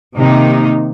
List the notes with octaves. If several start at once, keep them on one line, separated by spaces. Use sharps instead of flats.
C3 D#3 A#3 D#4